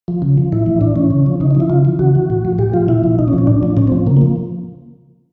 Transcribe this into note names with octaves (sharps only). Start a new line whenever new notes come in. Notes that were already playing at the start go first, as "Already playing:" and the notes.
F3
C#3
F3
A2 E4
E3
A2 D4
E3 C#4
C#3
F3
C#3 D#4
D#4
F3
E4
C#3 F4
E3
C#3 F#4
E3
A2
F3
A2 G4
F3 F4
A#2 E4
F3
A#2 D#4
C#4
F3
C#4
A2 D4
F3
A2 C#4
C4
F3
C#3 A#3
A#3
F3